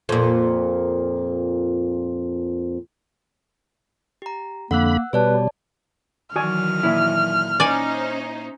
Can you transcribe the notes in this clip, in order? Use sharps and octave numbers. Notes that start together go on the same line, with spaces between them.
F2 A#2
G4 A#5
F2 D3 A#3 F#5 B5 E6 F#6
B2 G3 B4 C#5 D5 A5
D#3 E3 F#3 F#4 D5 G#5 F6
A#2 E4
C#4 D#4 C5 D5 G#5